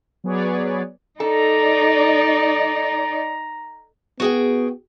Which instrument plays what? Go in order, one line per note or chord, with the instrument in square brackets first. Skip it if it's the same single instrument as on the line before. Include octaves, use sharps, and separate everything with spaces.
[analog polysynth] F#3 B3 G#4 B4 C#5 D5
[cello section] D#4 D5 [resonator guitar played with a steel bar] A4 [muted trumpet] A#5
[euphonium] B3 [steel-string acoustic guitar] F#4 G#4 G5